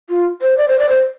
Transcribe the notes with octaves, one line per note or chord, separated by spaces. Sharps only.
F4
C5
D5
C5
D5
C5